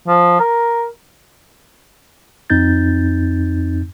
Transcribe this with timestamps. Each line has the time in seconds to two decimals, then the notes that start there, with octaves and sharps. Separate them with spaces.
0.07 F3
0.40 A#4
2.50 F2 C4 D#4 G6 A6